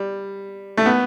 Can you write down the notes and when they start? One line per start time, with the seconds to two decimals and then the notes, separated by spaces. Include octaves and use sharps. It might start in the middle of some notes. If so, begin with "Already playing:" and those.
Already playing: G3
0.77 A3
0.86 B3